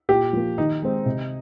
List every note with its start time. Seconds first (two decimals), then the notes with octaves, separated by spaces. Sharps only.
0.09 A#2 G4
0.33 F3 A#3
0.58 D#3 D#4
0.82 G#3 C4
1.06 C3